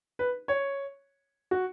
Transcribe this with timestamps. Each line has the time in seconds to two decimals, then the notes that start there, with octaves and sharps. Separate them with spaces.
0.19 B4
0.48 C#5
1.51 F#4